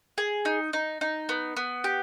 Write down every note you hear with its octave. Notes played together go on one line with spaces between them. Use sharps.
G#4
D#4
D#4
D#4
B3
B3
G4